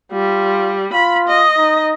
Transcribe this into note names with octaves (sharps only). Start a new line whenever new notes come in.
G3 F4
F4 B5
D#5
D#4